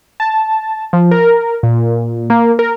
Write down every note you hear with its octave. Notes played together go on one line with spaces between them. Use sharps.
A5
F3
A#4
A#2
A#3
A#4